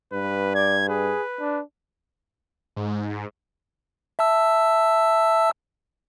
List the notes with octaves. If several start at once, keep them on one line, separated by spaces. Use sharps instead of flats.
G2 B4
D5 G#6
G#4 B4
D4
G#2
E5 A5 E6